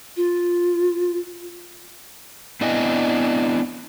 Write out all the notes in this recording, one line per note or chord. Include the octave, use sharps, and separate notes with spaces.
F4
B3 C4 D4 E4 D#5 G#5